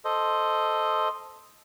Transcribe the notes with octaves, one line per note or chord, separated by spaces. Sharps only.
A4 C5 D#5